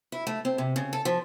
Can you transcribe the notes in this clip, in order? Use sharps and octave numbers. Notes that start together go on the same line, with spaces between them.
E4
A3
C4
C3
C#3
A4
F3